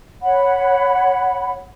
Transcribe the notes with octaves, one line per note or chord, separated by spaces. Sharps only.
C#5 F#5 B5